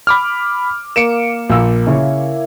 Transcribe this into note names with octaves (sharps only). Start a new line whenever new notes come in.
B5 D6 F6
A#3 C#7 D7 E7
A#1 E6
C#3 E4 C#5